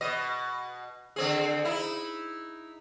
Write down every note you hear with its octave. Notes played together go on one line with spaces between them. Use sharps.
B2 D#5
D3 C4 G#4
D#4 E4